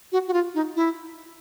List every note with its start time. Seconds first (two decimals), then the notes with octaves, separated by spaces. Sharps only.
0.12 F#4
0.28 F#4
0.33 F4
0.55 D#4
0.76 E4